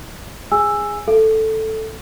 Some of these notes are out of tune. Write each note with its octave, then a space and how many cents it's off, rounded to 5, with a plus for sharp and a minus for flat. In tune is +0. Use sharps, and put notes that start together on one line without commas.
G#4 -15 G#5 -5 E6 +5
A4 +0 F5 -45